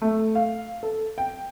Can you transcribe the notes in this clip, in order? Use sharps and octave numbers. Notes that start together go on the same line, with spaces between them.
A3
F5
A4
G5